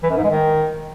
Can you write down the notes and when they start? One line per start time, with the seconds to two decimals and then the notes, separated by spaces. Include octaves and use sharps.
0.03 E3
0.10 F#2
0.17 G#2
0.24 G#3
0.31 D#3